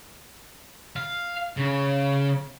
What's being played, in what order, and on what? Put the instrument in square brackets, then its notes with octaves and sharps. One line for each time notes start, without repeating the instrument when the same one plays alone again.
[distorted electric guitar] F5
C#3